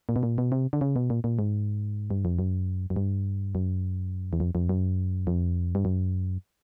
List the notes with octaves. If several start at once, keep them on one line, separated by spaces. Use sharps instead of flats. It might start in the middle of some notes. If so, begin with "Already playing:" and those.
A#2
B2
A#2
B2
C3
D3
C#3
B2
A#2
A#2
G#2
G2
F2
F#2
F#2
G2
F#2
E2
F2
F2
F#2
F2
G2
F#2